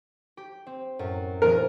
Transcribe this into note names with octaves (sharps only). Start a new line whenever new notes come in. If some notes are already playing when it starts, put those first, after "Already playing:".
G4
C4
F#2 A2
D#1 F3 G#4 A#4